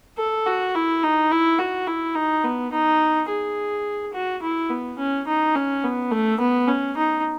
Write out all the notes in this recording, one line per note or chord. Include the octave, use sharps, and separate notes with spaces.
A4
F#4
E4
D#4
E4
F#4
E4
D#4
B3
D#4
G#4
F#4
E4
B3
C#4
D#4
C#4
B3
A3
B3
C#4
D#4